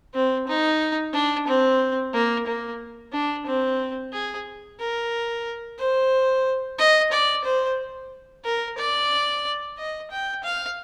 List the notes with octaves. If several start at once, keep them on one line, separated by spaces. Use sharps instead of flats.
C4
D#4
D4
C4
A#3
A#3
D4
C4
G#4
A#4
C5
D#5
D5
C5
A#4
D5
D#5
G5
F5